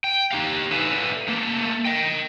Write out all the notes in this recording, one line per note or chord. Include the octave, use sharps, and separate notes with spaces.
G5
D#4 G4 F5
A4 B4 D5 E5 F5 G#5
A3 A#3
D#5 G5